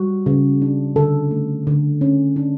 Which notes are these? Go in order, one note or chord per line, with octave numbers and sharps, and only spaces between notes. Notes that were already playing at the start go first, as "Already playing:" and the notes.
Already playing: G3 F#4
C#3
D4
D3 A4
A3
D3
C#4
D4